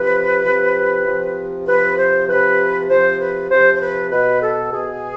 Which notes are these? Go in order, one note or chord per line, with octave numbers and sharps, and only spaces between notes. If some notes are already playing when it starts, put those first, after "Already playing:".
Already playing: C3 F3 B4
C3 F3
C3 F3
C3 F3 B4
C5
C3 F3 B4
C3 F3 C5
B4
C3 F3 C5
C5
B4
B2 B4
A4
B2 G#4